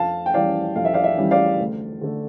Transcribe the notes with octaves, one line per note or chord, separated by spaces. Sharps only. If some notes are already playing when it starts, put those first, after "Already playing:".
Already playing: F2 F5 A5
G5
E3 G3 C#4 D5 F5
F2 F5
E5
D5 F5
E5
E3 G3 C#4
D5 F5
D2
D3 A3 D4